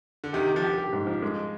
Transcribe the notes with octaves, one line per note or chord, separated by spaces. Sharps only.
D3
C3 D#3 G4
G4
D3 F3
G4
G4
G#2
F3
G#3